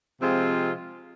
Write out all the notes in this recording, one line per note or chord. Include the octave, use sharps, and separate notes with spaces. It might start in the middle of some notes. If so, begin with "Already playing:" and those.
C3 F3 G#3 C4 F4